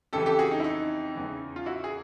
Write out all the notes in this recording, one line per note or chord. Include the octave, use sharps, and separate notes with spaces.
F2 C#3 E3 G4 A4
G4 A4
F#4 G#4
D#4
E4
D#4
E2 C#3 E3
F4
E4 F#4
G#4